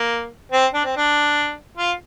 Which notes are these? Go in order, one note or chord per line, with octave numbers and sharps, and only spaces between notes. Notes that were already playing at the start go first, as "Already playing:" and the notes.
Already playing: A#3
C4
D4
C4
D4
F4